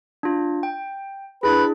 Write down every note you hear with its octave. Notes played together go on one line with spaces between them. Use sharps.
D4 F4
G5
D4 E4 G#4 B4